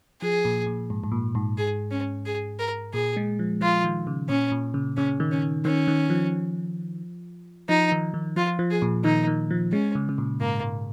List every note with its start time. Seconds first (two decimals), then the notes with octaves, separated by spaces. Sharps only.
0.21 F3 G#4
0.45 A#2
0.67 A#2
0.90 G#2
1.04 G#2
1.12 A#2
1.35 G#2
1.58 G#4
1.91 C#4
2.26 G#4
2.59 A#4
2.94 A#2 G#4
3.17 G#3
3.39 F3
3.61 F3 F4
3.84 D#3
4.07 C#3
4.29 A#2 C#4
4.52 A#2
4.74 C#3
4.97 C#3 C#4
5.20 D#3
5.31 C#4
5.65 D#3 C#4
5.88 D#3
6.10 F3
7.69 F3 D#4
7.92 D#3
8.14 D#3
8.36 F3 F4
8.59 F3
8.71 G#4
8.82 A#2
9.04 D#3 D#4
9.27 D#3
9.51 F3
9.72 G#3 C#4
9.95 C#3
10.09 C#3
10.18 A#2
10.40 G#2 A#3
10.63 G#2